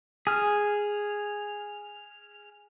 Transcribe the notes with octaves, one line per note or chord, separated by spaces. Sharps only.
G#4 F6